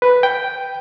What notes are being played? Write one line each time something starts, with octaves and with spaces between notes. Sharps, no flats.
B4
G5